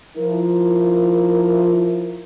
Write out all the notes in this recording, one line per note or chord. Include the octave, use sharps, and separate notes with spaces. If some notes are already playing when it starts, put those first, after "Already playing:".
F3 E4 A#4